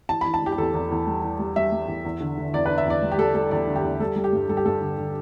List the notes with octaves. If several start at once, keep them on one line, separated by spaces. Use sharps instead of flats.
E3 A5
E3 B5
A5
E3 G4
G4
E2 A4
E2
E2
G3
E3
G3
G3 E5
G3
E2
E2
D3
D3
E2 D5
D4 B4
E5
E2 D5
G3
G4
G3 A4
G3 A4
E2 D5
D3
G4
E2
G3 A4
G3
G4
G2
G3 A4
G4
G2 A4
D3
D3